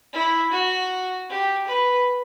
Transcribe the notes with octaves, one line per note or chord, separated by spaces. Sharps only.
E4
F#4
G4
B4